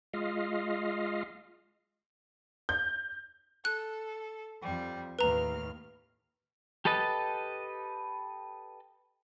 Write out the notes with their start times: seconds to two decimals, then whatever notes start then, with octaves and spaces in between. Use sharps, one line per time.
0.14 G#3 F4 D#5 F5
2.69 G6
3.65 A4 F#6
4.60 F2 G3
5.19 D#2 A2 B4 A#5 F6
6.85 G4 A4 B4 D#5 A5